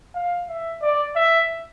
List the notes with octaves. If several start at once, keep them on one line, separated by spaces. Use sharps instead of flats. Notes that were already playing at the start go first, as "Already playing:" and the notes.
F5
E5
D5
E5